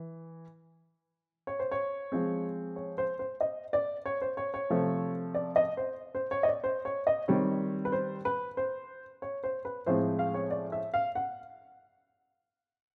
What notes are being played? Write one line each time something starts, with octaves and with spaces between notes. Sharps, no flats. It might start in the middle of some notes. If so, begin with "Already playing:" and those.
Already playing: E3
C#5
C5
C#5
F3 G#3 C4
C#5
C5
C5
D#5
D5
C#5
C5
C#5
C#5
C3 F3 A3
D5
D#5
C5
C5
C#5
D#5
D5
C5
C#5
D#5
D#3 G3 C4 C#5
B4
C5
B4
C5
C#5
C5
B4
A2 F3 G#3 C4 C5
F5
C#5
D5
E5
F5
F#5